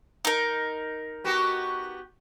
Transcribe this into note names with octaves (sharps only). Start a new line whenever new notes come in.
D#4 A#4
B3 F#4 G4